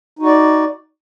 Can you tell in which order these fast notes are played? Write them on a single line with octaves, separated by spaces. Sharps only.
D#4 F#4 D5